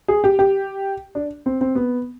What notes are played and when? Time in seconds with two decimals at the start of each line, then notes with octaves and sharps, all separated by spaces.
0.08 G#4
0.24 G4
0.39 G4
1.15 D4
1.46 C4
1.61 C4
1.75 B3